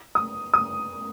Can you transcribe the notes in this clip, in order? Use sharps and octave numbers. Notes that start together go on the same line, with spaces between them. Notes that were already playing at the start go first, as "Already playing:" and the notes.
D#6
D#6